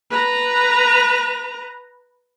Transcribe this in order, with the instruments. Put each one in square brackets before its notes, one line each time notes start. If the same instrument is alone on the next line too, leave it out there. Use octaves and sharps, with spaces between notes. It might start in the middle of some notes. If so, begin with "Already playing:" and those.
[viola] B4 A#5